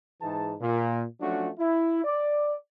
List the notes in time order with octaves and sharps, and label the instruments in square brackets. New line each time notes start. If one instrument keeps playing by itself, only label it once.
[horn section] G#2 E3 D#4 G#4 A5
A#2
F3 F#3 A3 C#4 D4 F#4
E4
D5